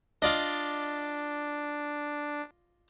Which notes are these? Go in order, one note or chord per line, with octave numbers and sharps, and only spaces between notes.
D4 F4 D5 D#5